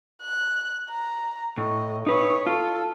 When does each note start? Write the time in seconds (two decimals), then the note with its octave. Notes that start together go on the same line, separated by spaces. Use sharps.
0.22 F#6
0.90 A#5
1.58 A2 D#5
2.06 D#4 B4 C#5
2.47 F4 A4